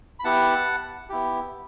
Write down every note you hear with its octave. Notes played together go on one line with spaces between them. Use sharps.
B5
B3 E4 G4 F#5 A5
B3 E4 G4